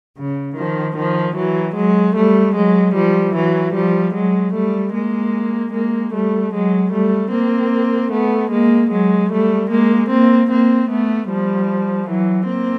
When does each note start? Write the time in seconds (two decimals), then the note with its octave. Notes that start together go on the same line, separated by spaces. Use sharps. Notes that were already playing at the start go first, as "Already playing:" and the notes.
0.17 C#3
0.56 D#3 F3
0.96 D#3 F3
1.35 E3 F#3
1.75 F#3 G#3
2.15 G3 A3
2.55 F#3 G#3
2.94 F3 G3
3.34 E3 F#3
3.74 F3 G3
4.13 F#3 G#3
4.53 G3 A3
4.94 G#3 A#3
5.72 G#3 A#3
6.12 G3 A3
6.53 F#3 G#3
6.92 G3 A3
7.32 A#3 C4
8.11 A3 B3
8.51 G#3 A#3
8.91 F#3 G#3
9.30 G3 A3
9.70 G#3 A#3
10.09 A#3 C4
10.50 A#3 C4
10.89 A3 B3
11.29 F3 G3
12.08 E3 F#3
12.48 A#3 C4